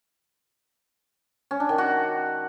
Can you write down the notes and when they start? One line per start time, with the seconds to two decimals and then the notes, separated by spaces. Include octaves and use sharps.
1.51 C#4
1.60 D4
1.69 D#3
1.78 F#4